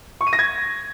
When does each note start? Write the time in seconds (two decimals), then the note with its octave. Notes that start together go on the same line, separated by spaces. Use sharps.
0.21 C#6
0.27 D#7
0.33 A#6
0.39 G#6